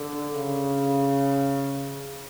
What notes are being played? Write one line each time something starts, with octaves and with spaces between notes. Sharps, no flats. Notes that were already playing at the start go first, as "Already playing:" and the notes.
Already playing: D3
C#3